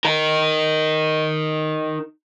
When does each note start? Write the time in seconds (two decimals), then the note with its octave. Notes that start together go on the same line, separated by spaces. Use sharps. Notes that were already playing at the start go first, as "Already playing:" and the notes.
0.05 D#4 A#4